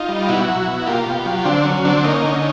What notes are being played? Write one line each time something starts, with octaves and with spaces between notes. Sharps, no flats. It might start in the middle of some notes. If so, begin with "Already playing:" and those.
Already playing: D#4 F4
G3
B2 E4 F#4
F#3
B2
A#3 F4 G4
B2
F#3
D3 C4 D4
F#3 C#4
D3 C4 D4
A#3 C#4 D#4
D3